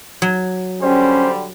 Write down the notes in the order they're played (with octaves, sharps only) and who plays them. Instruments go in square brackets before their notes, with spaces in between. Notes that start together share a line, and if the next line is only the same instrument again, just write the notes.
[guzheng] F#3
[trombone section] D3 G3 [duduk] C#4 [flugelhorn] C5